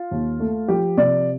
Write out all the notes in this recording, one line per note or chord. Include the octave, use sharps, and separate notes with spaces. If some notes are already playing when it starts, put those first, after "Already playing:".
Already playing: F4
D#2
A3
F3 G4
C3 D5